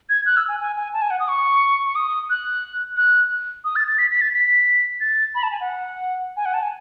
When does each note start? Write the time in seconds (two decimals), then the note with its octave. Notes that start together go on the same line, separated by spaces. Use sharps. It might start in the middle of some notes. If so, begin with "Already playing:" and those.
0.09 G#6
0.26 F#6
0.37 E6
0.48 G#5
0.60 G#5
0.76 G#5
0.93 A5
1.02 G#5
1.10 F#5
1.20 D#6
1.28 C#6
1.86 C#6
1.96 D#6
2.30 F#6
2.97 F#6
3.65 D#6
3.76 A6
3.88 A6
3.98 B6
4.11 B6
4.21 A6
4.34 B6
5.01 A6
5.35 B5
5.43 A5
5.51 G#5
5.61 F#5
6.37 G#5
6.45 F#5
6.54 A5
6.62 G#5